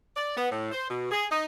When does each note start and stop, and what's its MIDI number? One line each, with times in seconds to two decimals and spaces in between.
0.16 0.34 74
0.37 0.48 59
0.51 0.70 45
0.72 0.87 72
0.89 1.07 47
1.11 1.25 68
1.30 1.45 63